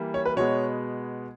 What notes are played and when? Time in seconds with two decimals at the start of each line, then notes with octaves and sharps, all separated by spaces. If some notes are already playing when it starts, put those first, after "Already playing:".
Already playing: E3 G3 A#3
0.14 C#5
0.25 B4
0.36 B2 G#3 B3 C#5